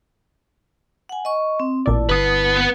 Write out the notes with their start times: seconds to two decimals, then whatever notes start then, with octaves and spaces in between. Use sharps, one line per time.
1.09 F#5 G#5
1.25 D#5 C#6
1.60 C4
1.86 A1 A#2 E4 D5 A5
2.10 G1 B3 B4 D#6 C7